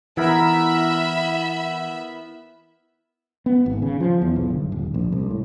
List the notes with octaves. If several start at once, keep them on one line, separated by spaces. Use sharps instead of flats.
E3 B3 E4 A#4 E5 B5
B3
G#1
C#3
F3
E2
B1
G1
D#1
A#1
C2
A2